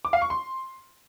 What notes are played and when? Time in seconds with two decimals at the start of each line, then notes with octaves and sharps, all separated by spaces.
0.05 D6
0.13 F5
0.22 C#6
0.30 C6